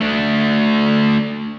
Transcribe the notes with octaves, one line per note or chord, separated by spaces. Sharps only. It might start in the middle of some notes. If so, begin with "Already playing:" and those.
A3 D4